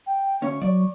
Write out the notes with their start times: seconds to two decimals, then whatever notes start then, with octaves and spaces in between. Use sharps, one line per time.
0.06 G5
0.42 D2 C#4 C#6
0.62 F#3 D5